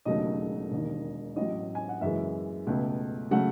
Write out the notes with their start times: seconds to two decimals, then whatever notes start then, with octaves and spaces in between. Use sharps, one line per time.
0.05 E1 D#2 C#3 F#3 A3 D#5
0.71 E1 D#2 D#3
1.36 A1 A2 F#3 D#5
1.75 G#5
1.89 F#5
2.01 F#1 F#2 E3 G#3 E5
2.67 C#2 B2 A3
3.31 C#3 F#3 A3 F#5